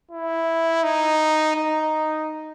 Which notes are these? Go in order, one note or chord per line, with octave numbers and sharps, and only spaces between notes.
E4
D#4
D#4